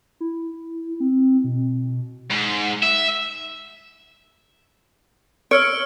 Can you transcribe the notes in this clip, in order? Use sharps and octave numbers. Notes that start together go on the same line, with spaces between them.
E4
C4
B2
G#2
E5
C#5 E6 F6 D7